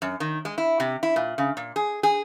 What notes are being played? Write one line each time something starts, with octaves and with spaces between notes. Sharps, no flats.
F#2
D#3
G#3
E4
C3
E4
A#2
C#3
A#2
G#4
G#4